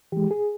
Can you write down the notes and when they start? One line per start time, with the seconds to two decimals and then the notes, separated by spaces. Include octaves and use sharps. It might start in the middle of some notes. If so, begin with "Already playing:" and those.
0.12 E3 G#3 G4
0.31 G#4